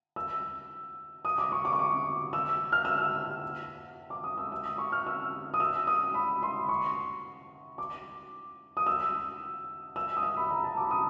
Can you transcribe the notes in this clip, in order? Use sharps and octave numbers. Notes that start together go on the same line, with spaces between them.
E6
D#6
D6
C#6
D6
C#6
D6
E6
F6
E6
F6
D6
D#6
E6
E6
D#6
C#6
F6
E6
D#6
E6
D#6
B5
C6
C#6
D6
D#6
E6
E6
D#6
E6
B5
A#5
A5
D6
D#6